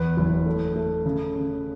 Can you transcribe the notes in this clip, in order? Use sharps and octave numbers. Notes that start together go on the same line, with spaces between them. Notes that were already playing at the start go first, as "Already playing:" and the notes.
Already playing: E2 B4
F#1
A3
A3
C#3
C#3